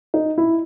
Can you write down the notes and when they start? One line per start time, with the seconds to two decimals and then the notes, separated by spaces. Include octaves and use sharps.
0.14 D#4
0.38 E4